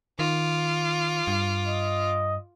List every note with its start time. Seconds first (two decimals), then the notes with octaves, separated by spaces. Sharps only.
0.19 D#3 F4 D6
1.27 G2
1.68 D#5